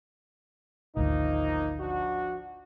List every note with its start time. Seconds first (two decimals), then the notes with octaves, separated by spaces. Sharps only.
0.96 G#1 D2 F3 A#3 D#4
1.80 F3 D4 F#4